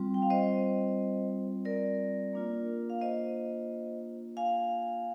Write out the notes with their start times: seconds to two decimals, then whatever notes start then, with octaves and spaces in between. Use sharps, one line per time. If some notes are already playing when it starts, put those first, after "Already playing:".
Already playing: G3 C4 F4
0.14 G5
0.22 F5
0.30 C5 D#5
1.65 A#4 D5
2.33 A#3 D4 F4
2.90 F5
3.01 C5 D#5
4.37 F5 G#5